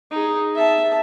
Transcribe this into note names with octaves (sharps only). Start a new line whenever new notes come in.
D#4 G#4
E5 A5